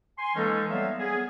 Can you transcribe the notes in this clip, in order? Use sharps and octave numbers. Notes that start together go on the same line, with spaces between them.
G#5 C6
E3 G#3 A#3 C#4 D#4 A4
F#3 G3 B3 E5 F5
B3 G#4